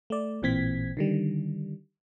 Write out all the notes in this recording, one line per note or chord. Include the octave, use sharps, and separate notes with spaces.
A3 D5
A1 A#2 E3 C4 G#6 B6
D3 D#3 G3